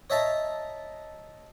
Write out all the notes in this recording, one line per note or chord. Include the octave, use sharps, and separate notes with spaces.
C#5 D#5 E5 A5 A#5